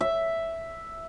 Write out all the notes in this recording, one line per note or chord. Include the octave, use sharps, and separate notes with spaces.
E5